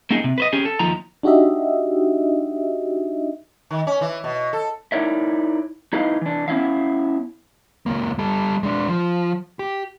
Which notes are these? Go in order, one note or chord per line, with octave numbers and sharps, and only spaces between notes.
A#3 C#4 D#4 G#4
C3
B4 C5 D#5
C#4 G4 G#4
A4
D#2 F3 D#4 A#5
D4 D#4 F#4 G4 D#5 E5
D#3
C#4
E3
B2
A4
D#4 E4 A#4 C#5 D5 E5
D#4 E4 G#4 B4 D#5 F5
E3 D4
B3 C#4 E4 E5 F5
C#2 A#3
G3 A4
G#3 D4
F3
G4